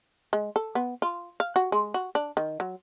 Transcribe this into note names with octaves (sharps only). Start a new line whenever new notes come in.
G#3
A4
B3
F4
F5
F#4
G#3
F#4
D4
D#3
F#3